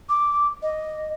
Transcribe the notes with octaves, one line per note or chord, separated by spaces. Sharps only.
D6
D#5